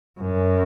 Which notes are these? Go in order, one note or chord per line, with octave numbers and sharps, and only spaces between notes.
F#2